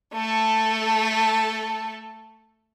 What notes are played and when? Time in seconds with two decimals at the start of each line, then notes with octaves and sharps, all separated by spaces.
0.14 A3 A4